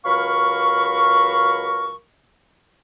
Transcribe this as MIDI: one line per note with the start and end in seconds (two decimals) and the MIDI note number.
0.05 1.96 37
0.05 1.96 54
0.05 1.96 70
0.05 1.96 77
0.05 1.96 83
0.05 1.96 85